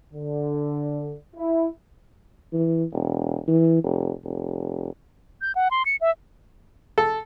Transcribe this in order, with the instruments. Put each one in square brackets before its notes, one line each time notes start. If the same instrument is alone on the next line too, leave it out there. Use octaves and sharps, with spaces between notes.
[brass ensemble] D3
E4
[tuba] E3
E1
E3
F1
F1
[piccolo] G6
F#5
C6
C#7
E5
[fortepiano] A4